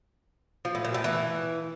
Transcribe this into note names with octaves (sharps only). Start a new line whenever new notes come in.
F3
A2
A#2
A2
E3